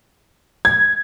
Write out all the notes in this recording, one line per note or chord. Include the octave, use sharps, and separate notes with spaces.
G#6